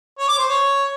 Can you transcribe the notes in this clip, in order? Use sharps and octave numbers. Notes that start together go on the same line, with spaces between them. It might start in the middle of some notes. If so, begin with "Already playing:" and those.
C#5
D6
C5
C#5